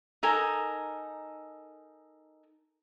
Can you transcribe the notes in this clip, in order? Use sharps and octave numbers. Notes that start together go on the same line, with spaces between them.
D#4 A4 A#4 G#5